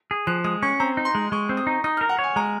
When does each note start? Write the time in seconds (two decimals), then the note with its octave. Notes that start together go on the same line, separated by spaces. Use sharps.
0.11 G#4
0.27 F3 F#6
0.44 G#3 D#6
0.62 C#4 C#6
0.80 C4 A#5
0.97 D#4
1.05 C6
1.15 G#3
1.32 G#3 C#6
1.49 C4
1.57 D#6
1.67 D#4
1.84 D#4 D#6
1.97 F6
2.01 A#4
2.09 F#5
2.19 C#5 G#5
2.36 G#3 A#5